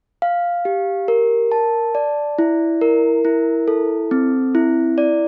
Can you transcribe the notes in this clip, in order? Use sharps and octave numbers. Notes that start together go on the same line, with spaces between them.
F5
G4
A#4
A5
D5
E4
A#4
E4
A4
C4
E4
D5